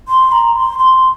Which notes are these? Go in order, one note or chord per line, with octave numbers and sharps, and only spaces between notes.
C6
A#5
C6
C6